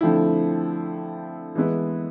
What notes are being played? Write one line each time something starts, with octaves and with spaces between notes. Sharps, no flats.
D3 F3 A3 C4 E4
E3 G#3 B3 E4